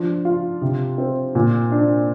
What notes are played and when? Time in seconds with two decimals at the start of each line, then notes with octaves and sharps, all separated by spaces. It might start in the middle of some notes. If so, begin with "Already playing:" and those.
Already playing: F3 D4
0.25 F4
0.62 C3
0.98 C4
1.35 A#2
1.72 D4